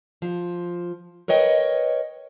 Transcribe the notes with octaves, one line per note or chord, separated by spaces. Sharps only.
F3
A#4 B4 C#5 D#5 G5